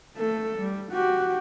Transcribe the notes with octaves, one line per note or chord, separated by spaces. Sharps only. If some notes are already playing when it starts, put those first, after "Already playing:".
A3 A4
G3
F#4 G4